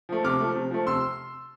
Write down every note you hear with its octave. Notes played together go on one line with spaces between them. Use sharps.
F3 A3
C3 D6 F6
F3 A3
C3
F3 A3
C3 C6 E6